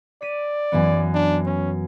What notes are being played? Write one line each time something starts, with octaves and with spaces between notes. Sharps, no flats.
D5 B6 D#7
F#2 E3 B3
D4
C#4